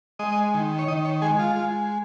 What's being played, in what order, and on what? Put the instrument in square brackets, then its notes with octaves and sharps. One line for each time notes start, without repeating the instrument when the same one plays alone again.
[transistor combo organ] G#3 D#5
D#3
C#5
D#3 D#5
C#5
G#3 G#4
F4
G#3